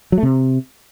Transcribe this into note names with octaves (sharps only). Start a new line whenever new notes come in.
F#3
A3
C3